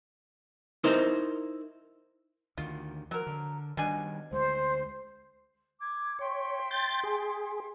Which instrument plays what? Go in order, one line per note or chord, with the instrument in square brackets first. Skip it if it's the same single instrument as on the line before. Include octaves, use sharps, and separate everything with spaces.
[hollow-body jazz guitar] D#4 E4 A#4 C5
[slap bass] D2 D#3 [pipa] F4
[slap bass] F3 [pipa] F#3 A#4
[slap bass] D3
[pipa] B2 D4 G#5 [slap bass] D#3 F#3 G3
[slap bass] D2 G#3 [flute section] C5
[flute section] D6 G#6
[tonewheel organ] C#5 [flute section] E5 G5 C6
[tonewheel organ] G6 A6
G#4